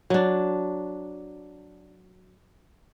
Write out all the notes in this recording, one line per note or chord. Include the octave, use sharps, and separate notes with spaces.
F#3 D4